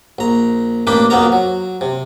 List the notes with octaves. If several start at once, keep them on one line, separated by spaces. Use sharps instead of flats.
A#1 A#5
A1 A#3 D4 G5 B5 D6
B1 F2 A#3 B3 A#4 A#5
F#3
C3